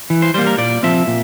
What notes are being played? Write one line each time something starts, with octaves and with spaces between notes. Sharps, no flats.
E3
C5
G3 A#3 C5
A#4
A#2 D5
F3 C4 E5
A#2